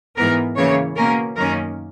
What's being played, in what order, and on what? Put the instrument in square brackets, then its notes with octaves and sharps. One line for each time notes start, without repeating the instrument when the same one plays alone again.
[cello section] G#2 E3 B3 A#4
C#3 E3 A#3 C#5
B2 A#3 C#4 A#4
F#2 D#3 A#3 C#4 A#4